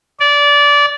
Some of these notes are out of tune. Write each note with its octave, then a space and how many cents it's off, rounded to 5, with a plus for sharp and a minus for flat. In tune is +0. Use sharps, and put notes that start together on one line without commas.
D5 -20